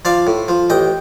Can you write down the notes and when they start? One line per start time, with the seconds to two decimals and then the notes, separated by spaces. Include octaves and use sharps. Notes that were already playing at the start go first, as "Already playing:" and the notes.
0.05 F3 D5 F5
0.27 A2
0.48 F3
0.70 A1 D#5 G5